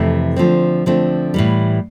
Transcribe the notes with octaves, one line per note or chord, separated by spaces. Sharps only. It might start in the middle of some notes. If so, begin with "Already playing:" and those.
Already playing: F2 C3 E3 A3
D3 F3 A3 C4
D3 F3 A3 C4
A2 E3 G3